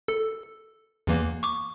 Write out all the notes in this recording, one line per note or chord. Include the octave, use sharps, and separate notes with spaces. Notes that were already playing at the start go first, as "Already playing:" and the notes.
A4
E2 E3 A#3
C#6 D6